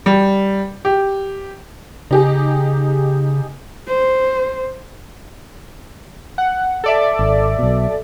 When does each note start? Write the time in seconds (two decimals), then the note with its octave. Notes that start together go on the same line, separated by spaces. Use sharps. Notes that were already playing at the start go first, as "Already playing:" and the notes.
0.06 G3
0.85 G4
2.11 C#3 D#4 G4 G#4
3.88 C5
6.38 F#5
6.84 A4 D5 E5
7.19 G#1
7.59 B1 B2